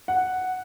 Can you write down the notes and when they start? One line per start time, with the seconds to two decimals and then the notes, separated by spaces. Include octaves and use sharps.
0.08 F#5